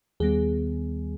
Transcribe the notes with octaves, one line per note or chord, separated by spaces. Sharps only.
D#2 D#3 G3 B3 G#4